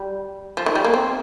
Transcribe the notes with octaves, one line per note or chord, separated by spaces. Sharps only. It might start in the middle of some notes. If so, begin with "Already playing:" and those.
Already playing: G3
F3
D#3
G3
A#3
C4